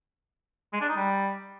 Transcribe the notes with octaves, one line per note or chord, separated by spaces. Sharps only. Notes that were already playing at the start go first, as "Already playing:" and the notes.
G#3
D4
D#4
G3